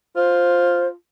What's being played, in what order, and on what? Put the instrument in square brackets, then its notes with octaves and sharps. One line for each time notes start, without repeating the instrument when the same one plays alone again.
[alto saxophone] F4 [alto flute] C5